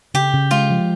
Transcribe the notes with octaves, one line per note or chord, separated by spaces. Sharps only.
C#3 G4
C#3
G#3 F4
F3